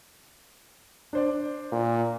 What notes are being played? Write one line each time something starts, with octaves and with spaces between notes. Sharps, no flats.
D4 C5 D5
A#2